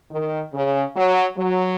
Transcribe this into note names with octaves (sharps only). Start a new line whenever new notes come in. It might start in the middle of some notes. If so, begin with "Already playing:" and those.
D#3
C#3
F#3
F#3